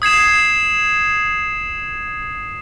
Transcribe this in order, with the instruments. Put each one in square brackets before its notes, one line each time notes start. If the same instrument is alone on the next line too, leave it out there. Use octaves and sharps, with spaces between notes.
[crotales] D#6 G#6 C7 E7